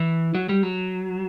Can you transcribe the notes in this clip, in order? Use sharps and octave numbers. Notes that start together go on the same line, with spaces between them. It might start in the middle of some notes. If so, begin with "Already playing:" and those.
Already playing: E3
F#3
G3
F#3